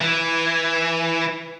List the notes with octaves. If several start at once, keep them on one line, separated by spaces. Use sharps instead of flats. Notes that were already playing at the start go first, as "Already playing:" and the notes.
E3